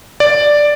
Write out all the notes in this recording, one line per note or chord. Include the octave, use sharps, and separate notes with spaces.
D5